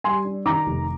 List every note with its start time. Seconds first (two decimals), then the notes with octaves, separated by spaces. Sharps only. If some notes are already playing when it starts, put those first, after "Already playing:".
0.04 G3 G#5 C6
0.25 D4
0.46 D#3 A#5 D6
0.67 F1